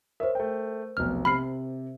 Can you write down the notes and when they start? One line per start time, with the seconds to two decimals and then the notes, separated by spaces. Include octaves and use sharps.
0.20 A#4 C5 C#5 E5
0.35 A3 G5
0.97 F1 B1 F6
1.25 C3 B5 F6 C7